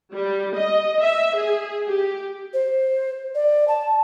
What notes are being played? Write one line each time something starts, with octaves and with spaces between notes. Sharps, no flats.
G3
D#5
E5
G#4
G4
C5
D5
A5